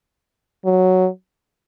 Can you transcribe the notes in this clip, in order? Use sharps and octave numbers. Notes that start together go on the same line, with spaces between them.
F#3